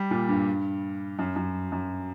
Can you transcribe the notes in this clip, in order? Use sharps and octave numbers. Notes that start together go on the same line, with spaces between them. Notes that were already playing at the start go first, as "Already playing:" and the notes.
Already playing: G3
A#2
G2
F#2
F#2
F#2